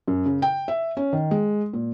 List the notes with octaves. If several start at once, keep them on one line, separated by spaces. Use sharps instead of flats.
F#2
C#3
G5
E5
C#4
D#3
G#3
A#2